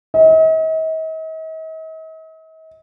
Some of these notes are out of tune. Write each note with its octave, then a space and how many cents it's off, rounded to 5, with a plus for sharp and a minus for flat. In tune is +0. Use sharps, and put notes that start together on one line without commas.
D#5 +45